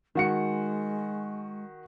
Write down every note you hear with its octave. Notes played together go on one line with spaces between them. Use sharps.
D#3 G#3 F#4 C#7